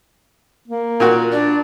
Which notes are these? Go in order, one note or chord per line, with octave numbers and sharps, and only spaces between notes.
A#3
A#2 F#4 A#4
D4 D5